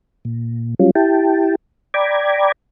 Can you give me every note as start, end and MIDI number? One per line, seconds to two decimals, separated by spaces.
0.25 0.74 46
0.79 0.91 54
0.79 0.91 55
0.79 0.91 61
0.79 0.91 65
0.95 1.55 64
0.95 1.55 67
0.95 1.55 79
0.95 1.55 81
1.94 2.52 74
1.94 2.52 79
1.94 2.52 82
1.94 2.52 83
1.94 2.52 86
1.94 2.52 92